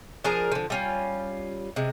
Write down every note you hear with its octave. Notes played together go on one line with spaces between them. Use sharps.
F3 D4 G#4 A#4
D3 F3
G3 C#4 F4
C3 G#3